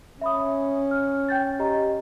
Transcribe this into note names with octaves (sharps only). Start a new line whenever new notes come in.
C#4 E5 B5 D#6
F6
G5 G6 A6
G4 D#5 A#5